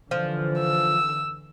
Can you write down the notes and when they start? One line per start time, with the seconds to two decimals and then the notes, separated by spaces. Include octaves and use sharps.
0.11 D3 E3 F3
0.59 E6